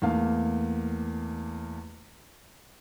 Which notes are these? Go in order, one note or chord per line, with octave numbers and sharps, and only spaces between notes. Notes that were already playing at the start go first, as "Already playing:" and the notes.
E2 A3 A#3 F5